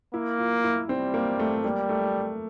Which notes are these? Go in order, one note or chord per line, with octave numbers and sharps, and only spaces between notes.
A#3 E4
F4
E4
G3 C4
A#3
A3
G3 A#3
A3